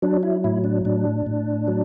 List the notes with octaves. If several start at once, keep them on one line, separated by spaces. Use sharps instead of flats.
F#3 D4
E4
A2 E4
D4
A2 D4
A2
F#3